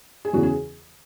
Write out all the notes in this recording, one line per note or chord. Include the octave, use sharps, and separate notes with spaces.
G#4
E2 C#3 E3 F#4
G#4